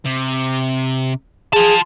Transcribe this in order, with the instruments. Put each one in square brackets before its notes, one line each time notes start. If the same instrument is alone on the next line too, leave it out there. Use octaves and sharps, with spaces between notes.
[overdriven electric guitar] C3
[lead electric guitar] F4 A5 [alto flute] G#4